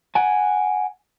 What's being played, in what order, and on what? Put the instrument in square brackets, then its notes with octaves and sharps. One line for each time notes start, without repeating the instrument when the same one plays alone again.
[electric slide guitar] F#5 G#5